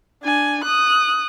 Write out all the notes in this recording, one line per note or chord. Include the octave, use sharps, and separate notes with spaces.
D4 G#5
D#6 F#6